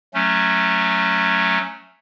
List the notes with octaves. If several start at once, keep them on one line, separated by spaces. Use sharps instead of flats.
F#3 A3 C#4